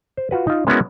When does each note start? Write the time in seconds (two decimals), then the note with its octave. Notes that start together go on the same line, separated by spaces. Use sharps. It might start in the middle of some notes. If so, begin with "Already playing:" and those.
0.17 C5
0.31 F4 F#4 B4
0.47 D#4 F4
0.67 G#3 B3 C#4 E4 F#4 A#4